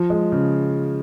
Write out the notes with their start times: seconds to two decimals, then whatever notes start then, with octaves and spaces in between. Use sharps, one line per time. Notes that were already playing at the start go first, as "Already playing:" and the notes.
Already playing: F3
0.10 G#3
0.32 C#3